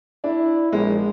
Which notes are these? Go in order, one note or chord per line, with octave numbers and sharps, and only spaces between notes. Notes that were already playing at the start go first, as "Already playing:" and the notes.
D4 E4
A#1 G#3